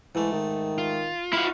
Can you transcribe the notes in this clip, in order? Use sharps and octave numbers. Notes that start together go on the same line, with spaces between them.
G#2 E3 A3
D#3
F4
E4 F#4 F5